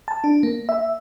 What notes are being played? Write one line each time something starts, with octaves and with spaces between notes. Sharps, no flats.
A5
D4
A#3
E5